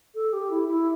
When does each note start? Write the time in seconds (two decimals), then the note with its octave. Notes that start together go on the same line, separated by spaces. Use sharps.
0.15 A4
0.33 G4
0.51 E4
0.68 E4